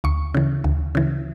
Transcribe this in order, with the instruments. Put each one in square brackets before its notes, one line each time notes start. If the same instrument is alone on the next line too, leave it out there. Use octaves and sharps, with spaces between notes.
[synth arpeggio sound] D2 C#6
C#3 E3
D2
C#3 E3